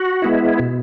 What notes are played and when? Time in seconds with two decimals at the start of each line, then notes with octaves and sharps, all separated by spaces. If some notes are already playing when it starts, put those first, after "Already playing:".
Already playing: F#4
0.22 G#3 B3 E4
0.59 B2